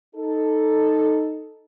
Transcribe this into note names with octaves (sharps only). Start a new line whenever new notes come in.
D#4 A4